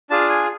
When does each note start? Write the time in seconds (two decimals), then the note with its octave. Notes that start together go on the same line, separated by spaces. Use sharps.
0.10 D4 F4 G#4 A5
0.30 G#5